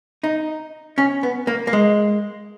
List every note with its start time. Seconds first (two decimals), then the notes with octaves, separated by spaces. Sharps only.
0.23 D#4
0.98 C#4
1.23 B3
1.47 A#3
1.67 A#3
1.73 G#3